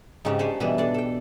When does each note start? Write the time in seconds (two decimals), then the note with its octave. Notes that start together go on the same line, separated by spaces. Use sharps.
0.25 G#2 C#3 C4 D#4 F4 G4
0.39 D4 G4 C5 C#5 G#5 B5
0.60 B2 E3 G3 D4 B4 B5
0.78 D4 A4 D5
0.94 A4 G5